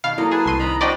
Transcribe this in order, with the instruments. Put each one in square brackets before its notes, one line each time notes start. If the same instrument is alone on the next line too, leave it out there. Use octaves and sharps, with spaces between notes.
[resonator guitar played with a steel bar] B2 D#3 [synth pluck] F5 [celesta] B5
[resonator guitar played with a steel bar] F#3 A#3 A4 [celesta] E4 [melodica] D#5
[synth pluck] G#4 [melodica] B4 G#5 A5
[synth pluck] C2 C6 D#7
[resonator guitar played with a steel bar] D#3 F3 [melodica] D#5 A#5 B5
[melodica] D4 F#4 B5 [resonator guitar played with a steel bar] C5 [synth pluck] D5 D#5 G5